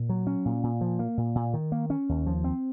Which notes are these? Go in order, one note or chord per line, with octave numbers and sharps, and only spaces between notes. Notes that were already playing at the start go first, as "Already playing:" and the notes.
Already playing: A#2
F#3
C#4
A#2
A#2
F3
A#3
A#2
A#2
D#3
A#3
C#4
D#2
F3
C4